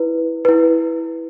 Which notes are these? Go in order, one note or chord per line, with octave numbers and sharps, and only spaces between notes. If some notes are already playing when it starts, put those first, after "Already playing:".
Already playing: E4 B4
E4 B4